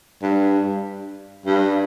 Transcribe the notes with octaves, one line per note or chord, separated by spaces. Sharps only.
G2
G2